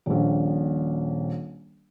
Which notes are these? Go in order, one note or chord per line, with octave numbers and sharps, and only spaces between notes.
D#1 A#1